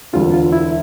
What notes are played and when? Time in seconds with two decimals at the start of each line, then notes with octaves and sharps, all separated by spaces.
0.13 E1 D2 D3 F4
0.34 F4
0.52 E4